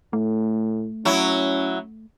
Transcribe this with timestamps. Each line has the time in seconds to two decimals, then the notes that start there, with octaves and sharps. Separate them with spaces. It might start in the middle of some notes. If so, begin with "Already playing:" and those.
0.13 A2 A3
1.05 F#3 C#4 E4